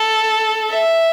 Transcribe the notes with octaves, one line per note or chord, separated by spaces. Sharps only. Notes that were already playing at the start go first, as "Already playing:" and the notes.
Already playing: A4
E5